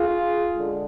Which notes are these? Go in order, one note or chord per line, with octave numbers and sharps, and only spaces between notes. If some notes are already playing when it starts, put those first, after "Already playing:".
Already playing: F4 G#4
D3 G#3